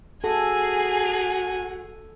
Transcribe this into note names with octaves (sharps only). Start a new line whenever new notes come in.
F#4 G#4 A4 G#5